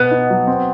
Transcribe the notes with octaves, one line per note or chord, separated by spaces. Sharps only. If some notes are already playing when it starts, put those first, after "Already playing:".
Already playing: B2 B3
D#4
F#3
C4